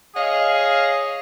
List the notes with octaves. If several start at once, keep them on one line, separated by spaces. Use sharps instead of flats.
G#4 C#5 D#5 F5